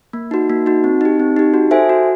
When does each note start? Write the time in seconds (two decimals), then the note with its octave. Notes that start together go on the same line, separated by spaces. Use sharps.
0.13 A#3
0.31 D#4 F#4
0.50 A#3
0.66 D#4 F#4
0.84 C4
1.01 D#4 G4
1.20 C4
1.36 D#4 G4
1.54 F#4
1.71 A4 C5 E5 G#5
1.89 F#4